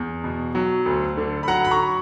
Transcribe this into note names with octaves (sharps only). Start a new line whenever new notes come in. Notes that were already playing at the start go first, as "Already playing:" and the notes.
Already playing: E2
B2
F#3
D2
D3
B5
F#3 F#5 A#5
B5
A#5 C#6